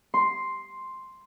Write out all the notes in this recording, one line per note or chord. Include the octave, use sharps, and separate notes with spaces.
C6